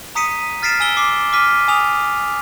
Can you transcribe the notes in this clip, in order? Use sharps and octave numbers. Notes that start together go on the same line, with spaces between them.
A#5 D#6 B6 C#7 D#7
F6 A6 B6 C7 D7 E7
G#5 E6 G7
D6 C7
D6 F6 B6 D#7
G#5 D#6 F7